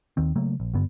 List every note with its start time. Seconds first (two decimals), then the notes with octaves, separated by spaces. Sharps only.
0.17 D#2 D#3 C4
0.36 C#3 F#3 A3 A#3
0.60 A#1
0.74 F#1 G2 D3 B3